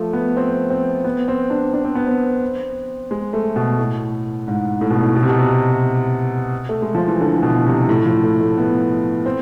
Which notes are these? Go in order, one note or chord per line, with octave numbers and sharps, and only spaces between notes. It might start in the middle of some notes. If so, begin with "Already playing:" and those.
Already playing: F3 A3
B3
C4
C4
B3
C4
D4
D4
C4
B3
C4
G#3
A3
B2
A2
G#2
A2
B2
A2
B2
C3
B2
C3
A3
G#3
F3
E3
D3
B2
C3
A2
F3
A3
A3
B3
C4